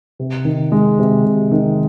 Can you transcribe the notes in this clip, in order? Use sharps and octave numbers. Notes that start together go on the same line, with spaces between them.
C3
D#3
G#3
C3
C3
D#3